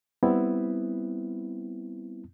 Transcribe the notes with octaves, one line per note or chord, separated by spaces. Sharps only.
G3 B3 C4 E4